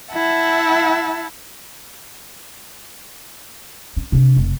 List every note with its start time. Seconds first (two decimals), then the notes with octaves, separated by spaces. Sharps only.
0.12 E4 E5 F#5 A5
3.97 C4
4.12 C3 D4
4.36 F1